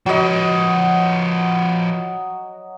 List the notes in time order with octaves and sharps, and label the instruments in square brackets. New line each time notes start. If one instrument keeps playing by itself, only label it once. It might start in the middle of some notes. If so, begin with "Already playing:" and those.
[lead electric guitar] F3 B4 [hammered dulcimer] F#3 D#5